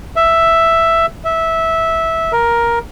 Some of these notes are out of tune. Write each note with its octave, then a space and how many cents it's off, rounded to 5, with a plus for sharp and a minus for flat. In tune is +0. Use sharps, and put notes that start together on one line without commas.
E5 +5
E5 -10
A#4 +10